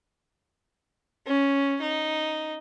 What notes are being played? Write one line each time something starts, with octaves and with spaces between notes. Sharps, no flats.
C#4
D#4